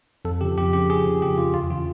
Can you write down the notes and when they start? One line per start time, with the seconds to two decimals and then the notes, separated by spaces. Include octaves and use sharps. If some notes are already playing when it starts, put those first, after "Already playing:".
0.25 F2 A4
0.41 C#3 F3 G4
0.58 F2 G4
0.73 C#3 F3 G4
0.90 F2 G#4
1.06 C#3 F3
1.22 F2 G4
1.38 C#3 F4
1.43 F3
1.54 E2 F4
1.70 C#3 E3 F4